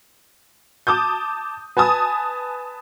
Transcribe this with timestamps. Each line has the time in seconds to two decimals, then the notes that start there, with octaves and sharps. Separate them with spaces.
0.87 A5 D6 D#6 G6
1.77 B4 G#5 A5 D#6